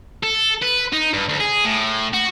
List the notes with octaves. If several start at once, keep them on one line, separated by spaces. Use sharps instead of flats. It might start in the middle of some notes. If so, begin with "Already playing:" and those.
A4
B4
D#4
G2
D2
G#4
A2
F#4